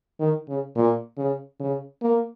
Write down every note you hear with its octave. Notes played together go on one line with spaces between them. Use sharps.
D#3
C#3
A#2
C#3
C#3
A#3